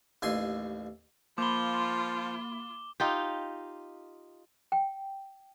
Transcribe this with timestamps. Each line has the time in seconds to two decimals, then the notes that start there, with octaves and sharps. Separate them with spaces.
0.22 A1 D#2 G#5 C6
1.38 F3 A#3 F4 B5 D6 G7
3.00 D#4 F4 G4
4.72 G5